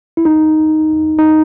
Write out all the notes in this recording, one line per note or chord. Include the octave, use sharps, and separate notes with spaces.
E4
D#4
D#4